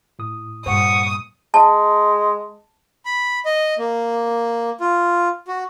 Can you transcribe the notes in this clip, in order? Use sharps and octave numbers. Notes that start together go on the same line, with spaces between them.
A2 D#6
G2 A#2 C5 F#5 C#6 D#6
G#3 A5
B5
D#5
A#3
F4
F#4